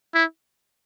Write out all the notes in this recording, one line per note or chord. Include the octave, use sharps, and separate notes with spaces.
E4